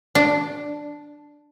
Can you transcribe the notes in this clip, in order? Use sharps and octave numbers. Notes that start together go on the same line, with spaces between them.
D4